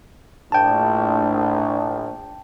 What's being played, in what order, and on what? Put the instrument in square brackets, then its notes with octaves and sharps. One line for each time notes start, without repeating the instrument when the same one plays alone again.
[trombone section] A#1 [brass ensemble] A2 D4 [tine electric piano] G5 A5